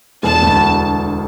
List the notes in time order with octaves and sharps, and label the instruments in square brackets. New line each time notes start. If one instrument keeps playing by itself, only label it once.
[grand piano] E1 [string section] A5
[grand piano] D2